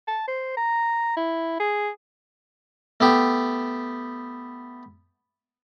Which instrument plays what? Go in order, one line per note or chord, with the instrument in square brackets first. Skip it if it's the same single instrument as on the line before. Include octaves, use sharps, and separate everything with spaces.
[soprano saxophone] A5
C5
A#5
E4
G#4
[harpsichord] A3 B3 G4